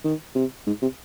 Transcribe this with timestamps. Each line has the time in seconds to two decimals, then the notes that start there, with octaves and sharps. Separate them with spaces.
0.04 D#3
0.35 C3
0.67 G#2
0.82 C3